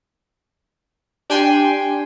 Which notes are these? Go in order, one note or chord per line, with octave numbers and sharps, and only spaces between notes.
D4 G4 G5 G#5 C6